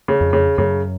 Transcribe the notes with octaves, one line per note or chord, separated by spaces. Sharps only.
C#3
F2
C#3
F#2 C#3